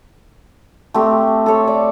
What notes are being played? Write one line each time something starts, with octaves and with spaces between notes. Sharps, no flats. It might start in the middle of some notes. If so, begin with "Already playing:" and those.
A3 C4 G4
A4 C#5
D5